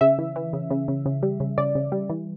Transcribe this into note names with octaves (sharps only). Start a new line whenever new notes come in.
C#3 E5
E3
E3
C#3
C#3
C#3
C#3
G3
C#3
C#3 D5
C#3
G3
E3